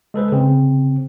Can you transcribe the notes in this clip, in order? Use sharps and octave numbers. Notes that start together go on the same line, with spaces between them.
G#3 A4 B4 C5
C#3 C4